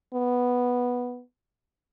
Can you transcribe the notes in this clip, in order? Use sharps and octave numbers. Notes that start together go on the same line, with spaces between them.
B3